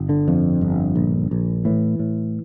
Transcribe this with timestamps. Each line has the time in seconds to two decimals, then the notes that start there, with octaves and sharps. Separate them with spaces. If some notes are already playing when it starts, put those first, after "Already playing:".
Already playing: G1
0.09 D3
0.28 F2
0.61 G1
0.96 A#1
1.31 A#1
1.65 A2 E3
1.99 A2